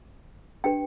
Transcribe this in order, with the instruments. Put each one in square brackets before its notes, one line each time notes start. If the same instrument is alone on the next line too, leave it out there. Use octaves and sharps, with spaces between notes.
[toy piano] D4 G4 B4 G5